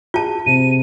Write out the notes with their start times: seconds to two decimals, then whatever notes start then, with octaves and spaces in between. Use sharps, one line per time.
0.14 F4 G#4 A5
0.46 C3 D#7